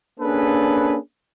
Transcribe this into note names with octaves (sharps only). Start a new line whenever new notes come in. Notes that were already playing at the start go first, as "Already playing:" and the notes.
A#3 C#4 D4 G#4 A4 B4